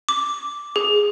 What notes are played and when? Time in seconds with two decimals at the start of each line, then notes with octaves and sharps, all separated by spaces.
0.09 D6
0.76 G#4